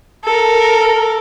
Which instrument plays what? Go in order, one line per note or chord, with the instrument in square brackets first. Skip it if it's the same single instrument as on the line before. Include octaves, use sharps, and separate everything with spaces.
[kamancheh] A4 A#4